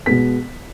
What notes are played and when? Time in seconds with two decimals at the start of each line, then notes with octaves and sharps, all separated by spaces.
0.06 B2 G#3 B3 B6